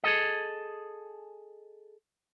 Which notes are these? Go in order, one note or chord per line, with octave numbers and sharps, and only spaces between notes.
G#4 A4 D#5